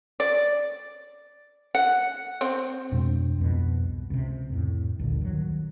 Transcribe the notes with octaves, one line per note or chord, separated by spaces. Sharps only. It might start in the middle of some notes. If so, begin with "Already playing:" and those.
D5
F#5
C4
F2 B2 G#3 D4
C2 F2 G#2 B2
C#2 C3
F2 A2
A1 D2 G2 A#2
D#3 F#3